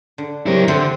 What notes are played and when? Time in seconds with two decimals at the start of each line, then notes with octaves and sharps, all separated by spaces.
0.18 D3
0.46 F#3 C4 E4 G4 A#4
0.68 D3 C4 A4 E5